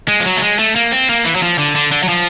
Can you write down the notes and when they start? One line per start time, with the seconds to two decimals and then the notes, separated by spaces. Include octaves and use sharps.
0.08 G#3
0.20 F3
0.26 F#3
0.37 A3
0.42 G#3
0.59 A3
0.76 A#3
0.92 C4
1.09 A#3
1.25 E3
1.35 F#3
1.43 F3
1.59 D3
1.76 D3
1.92 D3
2.03 F#3
2.09 F3